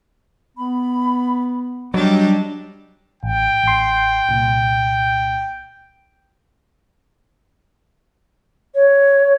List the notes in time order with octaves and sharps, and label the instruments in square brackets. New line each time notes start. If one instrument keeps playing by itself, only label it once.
[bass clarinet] B3 [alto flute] B5
[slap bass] F#3 [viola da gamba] G3 D4 [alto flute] D#5
[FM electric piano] A1 [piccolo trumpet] G5
[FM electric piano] A1 C6
C2 A#2
[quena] C#5